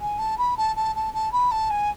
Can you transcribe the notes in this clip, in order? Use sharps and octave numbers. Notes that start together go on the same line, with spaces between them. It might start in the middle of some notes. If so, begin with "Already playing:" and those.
G#5
A5
B5
A5
A5
A5
A5
B5
A5
G#5